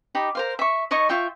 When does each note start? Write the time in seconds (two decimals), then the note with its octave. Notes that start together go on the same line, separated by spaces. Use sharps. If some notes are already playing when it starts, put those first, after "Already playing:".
0.15 D#4 G4 B5
0.35 A#4 C5 F5
0.59 E5 C#6
0.91 D#4 C#5 D#5 C#6
1.09 F4 E5 G5 C#6